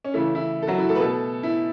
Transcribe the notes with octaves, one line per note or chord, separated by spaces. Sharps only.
C#4
C#3 E3 A3 E4
E4
A4
F#3 F#4
E4
A3 A4
B4
B2 A3 A4
E4